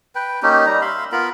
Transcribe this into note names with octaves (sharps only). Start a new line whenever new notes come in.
B4 G5
A#3 C#4 D#4 G4
G3 D#4 A#5
E5 F5 B5 C6
B3 F4 A#4 B5